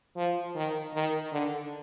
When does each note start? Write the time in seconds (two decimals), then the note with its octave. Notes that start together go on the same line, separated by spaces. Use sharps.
0.16 F3
0.56 D#3
0.95 D#3
1.33 D3